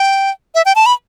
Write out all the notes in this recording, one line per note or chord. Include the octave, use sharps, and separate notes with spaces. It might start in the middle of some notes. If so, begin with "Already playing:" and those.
Already playing: G5
E5
G5
A5
B5